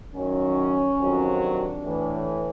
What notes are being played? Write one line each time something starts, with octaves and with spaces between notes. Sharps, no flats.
F#2 D#3 F#3 C#4
F2 C3 D#3 F#3
D4
A2 E3